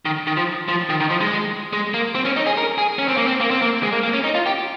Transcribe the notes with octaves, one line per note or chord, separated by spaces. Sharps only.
D#3
D#3
F3
F3
D#3
D#3
F3
G#3
G#3
A#3
C4
C#4
D#4
G#4
A#4
G#4
C#4
C4
A#3
C4
A#3
C4
A#3
G#3
A#3
A#3
C#4
D#4
F4
G4